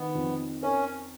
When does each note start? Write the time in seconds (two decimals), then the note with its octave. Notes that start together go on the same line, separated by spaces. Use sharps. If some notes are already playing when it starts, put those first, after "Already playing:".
Already playing: D#3 B3
0.15 F2
0.63 C#4 A#4